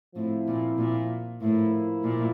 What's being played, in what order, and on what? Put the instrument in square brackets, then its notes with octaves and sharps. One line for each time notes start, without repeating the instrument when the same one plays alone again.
[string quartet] A2 [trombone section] F3 C4 E4
[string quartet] A#2
A#2
[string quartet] A2 [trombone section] F3 A#3 E4
[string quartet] A#2